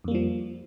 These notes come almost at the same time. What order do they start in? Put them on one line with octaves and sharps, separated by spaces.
F2 A#3 G3 F3